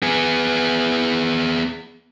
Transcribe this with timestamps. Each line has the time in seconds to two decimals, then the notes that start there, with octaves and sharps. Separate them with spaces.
0.03 B3 G#4